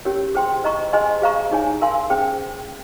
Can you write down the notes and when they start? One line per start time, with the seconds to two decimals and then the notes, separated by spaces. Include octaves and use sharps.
0.05 C#4 G4 A#4 C#5
0.34 G#4 C5 G5 C6
0.64 C5 D#5 A#5 C#6
0.93 G#4 C5 D#5 G#5 C6
1.22 G#4 C5 F5 A#5 C#6
1.51 D#4 G#4 C#5 G#5
1.82 A#4 F5 G#5 C6
2.10 C#4 G#4 C5 G5